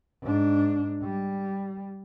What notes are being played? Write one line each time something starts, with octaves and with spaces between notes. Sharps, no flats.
G#2 D4
G3